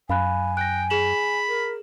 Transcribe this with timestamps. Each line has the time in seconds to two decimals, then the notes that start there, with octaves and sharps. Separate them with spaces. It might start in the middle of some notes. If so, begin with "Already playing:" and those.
0.10 F#2 F5 G#5 B5 F#6
0.57 G5 F#6 A#6
0.90 G#4 B5 E7 F#7
1.48 A#4